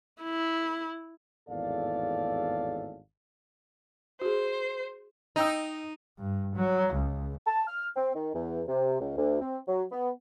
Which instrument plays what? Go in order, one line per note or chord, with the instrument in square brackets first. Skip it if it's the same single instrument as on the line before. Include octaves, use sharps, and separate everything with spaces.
[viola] E4
[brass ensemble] G#1 E2 A2 A4 D5 F5
[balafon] F#4 G#4 [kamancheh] C5
[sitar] D#4 [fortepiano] D#5 G5 E6
[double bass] G2
F#3
C#2
[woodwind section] A5
F6
C4
D#3
E2
C3
C#2
D2
C4
F#3
B3